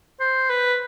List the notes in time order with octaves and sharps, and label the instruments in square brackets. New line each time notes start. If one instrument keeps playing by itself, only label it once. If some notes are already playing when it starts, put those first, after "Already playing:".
[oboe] C5
B4